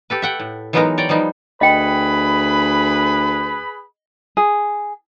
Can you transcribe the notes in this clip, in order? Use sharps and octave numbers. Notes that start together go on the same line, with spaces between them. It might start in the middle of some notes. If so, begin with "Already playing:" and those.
G4 A4 B4
E5 F#5 G5
A2
E3 F#3 G#3 B3 D#4 A#4
C#5 D5 G5 A#5
F3 G3 B3 D#4
D2 G#4 B4 D#5 G5 B5
G#4